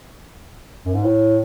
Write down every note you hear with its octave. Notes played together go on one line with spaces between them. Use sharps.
F#2
G#2
A2